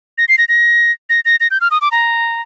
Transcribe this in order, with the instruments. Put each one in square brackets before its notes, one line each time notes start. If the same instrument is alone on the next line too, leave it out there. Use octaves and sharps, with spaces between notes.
[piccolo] A#6
C7
A#6
A#6
A#6
A#6
A#6
G6
F6
D#6
D6
A#5